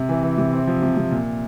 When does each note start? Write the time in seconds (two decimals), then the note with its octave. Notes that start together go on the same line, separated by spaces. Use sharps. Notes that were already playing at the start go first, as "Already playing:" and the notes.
Already playing: C3
0.09 E3
0.23 E3
0.38 C3
0.53 C4
0.67 F3
0.82 C3
0.97 C3
1.11 A#2